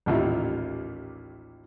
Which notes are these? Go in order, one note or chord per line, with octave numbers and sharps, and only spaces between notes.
A1 D#2 A#2 E4